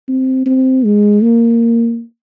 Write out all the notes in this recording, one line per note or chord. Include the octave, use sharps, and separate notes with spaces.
C4
C4
G#3
A#3